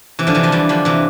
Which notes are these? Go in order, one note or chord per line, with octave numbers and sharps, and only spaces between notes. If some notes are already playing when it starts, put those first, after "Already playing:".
C3 E3
D3 F3
C3 E3
D3 F3
E3 G3
D3 F3
C3 E3